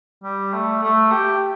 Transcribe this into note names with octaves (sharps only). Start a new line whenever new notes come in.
G3
A3
A3
G4